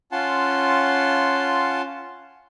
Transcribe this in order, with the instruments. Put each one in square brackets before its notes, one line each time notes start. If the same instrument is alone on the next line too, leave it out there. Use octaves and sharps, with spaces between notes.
[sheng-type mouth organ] C#4 F4 F#5 A5 C6